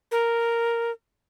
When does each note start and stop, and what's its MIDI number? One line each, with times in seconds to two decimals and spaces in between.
0.11 0.91 70